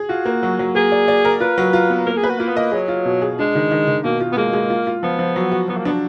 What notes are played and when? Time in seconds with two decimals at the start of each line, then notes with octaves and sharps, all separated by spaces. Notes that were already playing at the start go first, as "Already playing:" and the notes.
Already playing: G#4
0.09 F4 F#4
0.25 A#3
0.43 F#3
0.59 F#3
0.75 A#3 G#4
0.92 D5
1.08 D5
1.25 A#4
1.40 F4 B4
1.58 F#3
1.73 F4
1.90 B3
2.06 A#3 A#4
2.17 G#4
2.23 B4
2.29 F#4
2.39 A#3 F4
2.48 B3
2.56 A#3 D#5
2.72 F#3 G#4
2.88 F4
3.05 B2
3.22 G#4
3.39 G#3 D4
3.55 D#3
3.71 D#3
3.88 D#3
4.04 B2 A#3
4.20 F4
4.32 B3
4.37 G#3 A#3
4.53 G#3
4.70 F4
4.87 F4
5.03 F3 B3
5.19 F3
5.36 F#3
5.51 F#4
5.68 F#3 B3
5.77 A#3
5.85 B3 D4